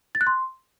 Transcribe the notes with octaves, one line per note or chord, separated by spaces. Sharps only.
A6
F#6
C6